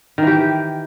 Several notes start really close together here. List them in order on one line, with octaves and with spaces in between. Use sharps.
D#3 E3 G4